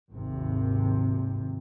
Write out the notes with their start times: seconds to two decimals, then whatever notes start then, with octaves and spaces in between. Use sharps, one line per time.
0.10 G#1 D#2 C3